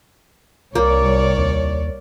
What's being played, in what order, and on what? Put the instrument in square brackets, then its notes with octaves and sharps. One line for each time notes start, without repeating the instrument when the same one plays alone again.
[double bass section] C2 [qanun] A#3 [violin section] C#5 D5
[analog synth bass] D#2